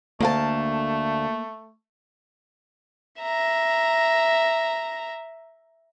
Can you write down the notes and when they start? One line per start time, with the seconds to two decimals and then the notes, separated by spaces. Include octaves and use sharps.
0.21 D2 A3 A#3 F5 A5
3.22 E5 A#5